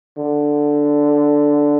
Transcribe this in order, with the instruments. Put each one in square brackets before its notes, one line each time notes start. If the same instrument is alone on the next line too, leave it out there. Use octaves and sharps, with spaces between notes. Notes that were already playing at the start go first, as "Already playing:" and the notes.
[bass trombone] D3